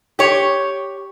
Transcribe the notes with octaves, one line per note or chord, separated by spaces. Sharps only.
G4 C#5